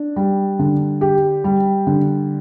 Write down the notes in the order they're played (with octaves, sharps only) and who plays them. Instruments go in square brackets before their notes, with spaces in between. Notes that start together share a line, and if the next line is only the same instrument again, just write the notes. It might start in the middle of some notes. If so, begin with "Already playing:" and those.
Already playing: [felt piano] D4
G3
D3
G4
G3
D3